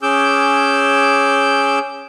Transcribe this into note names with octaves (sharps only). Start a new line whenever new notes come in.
C#4 G#4 D6 E6 G6